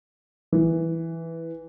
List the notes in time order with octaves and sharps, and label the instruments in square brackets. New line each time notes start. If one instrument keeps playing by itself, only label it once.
[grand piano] E3